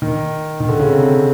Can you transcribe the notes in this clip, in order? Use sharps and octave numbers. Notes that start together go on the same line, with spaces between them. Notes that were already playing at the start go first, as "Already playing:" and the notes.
D#3
D#3
D3
C#3
C3